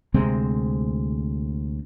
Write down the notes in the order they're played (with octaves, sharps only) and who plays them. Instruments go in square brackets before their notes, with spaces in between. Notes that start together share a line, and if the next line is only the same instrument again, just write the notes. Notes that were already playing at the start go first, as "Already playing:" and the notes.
[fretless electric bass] D2 C3 G#3 C4